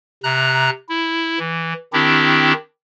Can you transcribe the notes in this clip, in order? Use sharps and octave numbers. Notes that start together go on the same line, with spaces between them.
C3 A#5 F#6
E4
E3
D#3 C4 D4 E4 G4